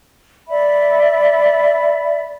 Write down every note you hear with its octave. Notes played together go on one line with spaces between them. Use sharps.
D5 E5 B5